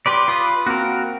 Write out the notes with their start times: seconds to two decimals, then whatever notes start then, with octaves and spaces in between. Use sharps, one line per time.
0.06 G4 B4 D5 B5 C6 D6
0.28 F4 B4 B5 D#6
0.67 A#3 C4 F#4 A#4